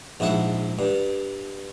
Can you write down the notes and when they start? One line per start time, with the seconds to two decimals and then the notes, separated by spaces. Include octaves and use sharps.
0.20 A#1 G#2 E4 F#5
0.79 G2